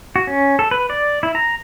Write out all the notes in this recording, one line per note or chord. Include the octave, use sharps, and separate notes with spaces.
F#4
C#4
A4
B4
D5
E4
A#5